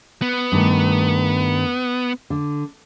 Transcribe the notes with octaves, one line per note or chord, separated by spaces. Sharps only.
B3
G2 D#3 A3
D3